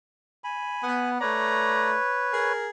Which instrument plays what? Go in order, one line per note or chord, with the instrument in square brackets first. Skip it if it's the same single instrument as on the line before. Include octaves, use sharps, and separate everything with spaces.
[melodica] G#5 B5
[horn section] B3
[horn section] A3 D5 A#5 [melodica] B4 C#5
[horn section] G#4 A#4